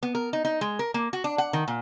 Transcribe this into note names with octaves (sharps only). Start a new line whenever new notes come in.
B3
A#4
D#4
D#4
G#3
A#4
A#3
F#4
D4
F#5
D#3
A#2